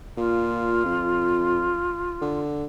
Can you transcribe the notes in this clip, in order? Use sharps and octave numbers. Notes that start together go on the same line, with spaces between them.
A#2 F4
F2
D3